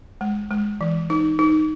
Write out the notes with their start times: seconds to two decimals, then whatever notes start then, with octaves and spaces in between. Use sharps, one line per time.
0.21 G#3
0.51 G#3
0.81 E3
1.10 D#4
1.39 D#4